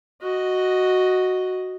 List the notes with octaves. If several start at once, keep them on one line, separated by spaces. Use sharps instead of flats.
F#4 D#5